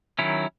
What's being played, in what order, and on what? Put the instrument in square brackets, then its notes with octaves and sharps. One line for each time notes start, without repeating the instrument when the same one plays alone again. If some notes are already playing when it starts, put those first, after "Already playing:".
[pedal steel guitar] D#3 F#3 C#4 E4